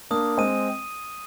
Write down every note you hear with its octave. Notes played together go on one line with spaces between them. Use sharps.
A#3 D4 D#6
G#3 C4 D#7